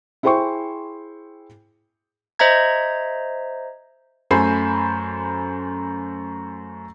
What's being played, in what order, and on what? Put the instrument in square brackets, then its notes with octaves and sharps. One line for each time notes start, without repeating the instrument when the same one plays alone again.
[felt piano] E4 G#4 C5 G5 C6 C#6
[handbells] C5 D#5 E5 A#5 G#6
[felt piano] F#2 A3 C5 G#5 B5 C7